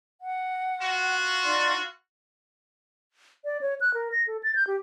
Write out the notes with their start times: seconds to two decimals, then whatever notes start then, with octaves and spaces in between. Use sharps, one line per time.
0.20 F#5
0.81 F4 F#4
1.43 D#4 D5 C6
3.45 D5
3.61 C#5
3.81 F#6
3.94 A#4
4.12 A#6
4.27 A4
4.43 A6
4.56 G6
4.67 G4